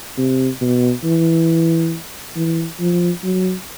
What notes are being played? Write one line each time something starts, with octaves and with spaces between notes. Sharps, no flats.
C3
B2
E3
E3
F3
F#3